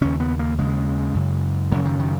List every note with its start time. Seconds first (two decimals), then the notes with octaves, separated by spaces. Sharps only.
0.01 D#2 C#3 C#4
0.20 B3
0.39 A#3
0.58 D#2 C#3 G#3
1.15 F#2 C#3
1.72 F#2 C#3 F#3
1.85 D#3
1.99 D#3